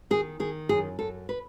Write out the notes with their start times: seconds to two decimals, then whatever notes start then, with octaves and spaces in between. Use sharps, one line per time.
0.10 D#3 G#4
0.40 D#3 G#4
0.69 F#2 G#4
0.99 F#2 A4
1.29 B4